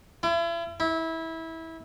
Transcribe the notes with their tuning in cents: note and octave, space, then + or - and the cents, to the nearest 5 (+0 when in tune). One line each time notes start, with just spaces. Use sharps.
E4 +40
E4 -20